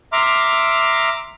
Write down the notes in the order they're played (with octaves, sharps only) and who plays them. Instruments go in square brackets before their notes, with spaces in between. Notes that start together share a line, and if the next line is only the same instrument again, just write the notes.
[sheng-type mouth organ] E5 A#5 C6 D6 F6